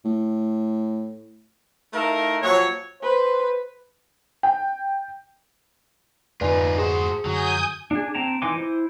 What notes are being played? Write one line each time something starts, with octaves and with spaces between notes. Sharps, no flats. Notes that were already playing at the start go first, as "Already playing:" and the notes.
A2
A3 D#4 E4 A4 A#4 F5
A#2 F3 F#3 C#5
B4 C5
G5
F2 G#2 D3 D#4 F4 B4 D5 G#5
F#4 G#4 C5
F#2 D3 F#3 G#5 D#6 G6
D4 G#4
C4 G5 A5 A#5
E3 D#4 G#5 C6 D6
E4 C5